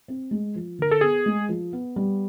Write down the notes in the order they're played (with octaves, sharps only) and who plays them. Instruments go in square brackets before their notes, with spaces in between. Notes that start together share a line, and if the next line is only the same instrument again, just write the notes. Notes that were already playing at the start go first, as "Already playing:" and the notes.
[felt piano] C4
G#3
F3
[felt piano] D3 [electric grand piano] A#4
[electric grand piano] A4
[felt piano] B3 [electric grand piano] G#4
[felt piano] G#3
F3
B3
G3